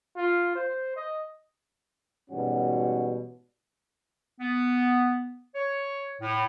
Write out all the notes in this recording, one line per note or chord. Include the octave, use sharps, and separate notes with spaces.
F4
C5
D#5
G#2 B2 E3 G3 C#4 F#4
B3
C#5
A2